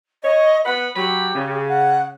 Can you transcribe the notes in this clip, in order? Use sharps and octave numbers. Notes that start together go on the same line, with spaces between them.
C#5 D#5
B3 B4 F#5 B5
F#3 G4 B5
C#3
F#5